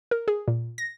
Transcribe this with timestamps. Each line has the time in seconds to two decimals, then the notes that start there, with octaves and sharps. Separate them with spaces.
0.11 A#4
0.28 G#4
0.48 A#2
0.78 A#6